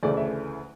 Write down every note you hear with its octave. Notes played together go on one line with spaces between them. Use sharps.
D2 C#3 E3 A3 D5
E5